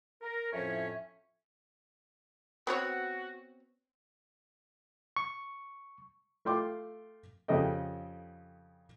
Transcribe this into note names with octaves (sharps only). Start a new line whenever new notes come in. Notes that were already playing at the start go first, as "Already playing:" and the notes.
A#4
F2 A2 F3 C#4 C#5 E5
B3 C4 F#4 C#5
C#6
A3 F4 G5 C6 D6
F2 C#3 G4 A4 D#5 G5